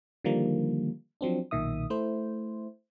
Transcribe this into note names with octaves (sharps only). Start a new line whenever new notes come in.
D3 D#3 F3 G3 A#3
F3 F#3 C4 D4
B1 A#2 D#3 E5 D#6
A3 E4 C5